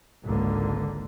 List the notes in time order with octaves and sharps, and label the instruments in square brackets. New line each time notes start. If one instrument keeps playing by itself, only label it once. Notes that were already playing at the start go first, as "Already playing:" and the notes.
[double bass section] G#1 C#2 G#2 D3 A#3